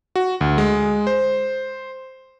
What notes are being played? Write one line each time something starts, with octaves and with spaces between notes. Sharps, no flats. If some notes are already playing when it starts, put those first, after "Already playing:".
F#4
D2
G#3
C5